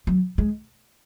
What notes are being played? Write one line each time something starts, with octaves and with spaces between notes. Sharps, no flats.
F#3
G#3